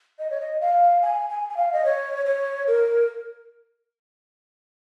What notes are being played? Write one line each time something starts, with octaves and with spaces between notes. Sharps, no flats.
D#5
C#5
D#5
F5
G#5
G#5
G#5
F5
D#5
C#5
C#5
A#4